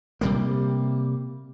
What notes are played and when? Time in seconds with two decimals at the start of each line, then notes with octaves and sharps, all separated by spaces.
0.21 C3 G3 A#3